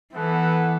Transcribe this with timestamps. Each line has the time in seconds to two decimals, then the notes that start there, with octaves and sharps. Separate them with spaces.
0.12 E3 B3 E4 A4 F#5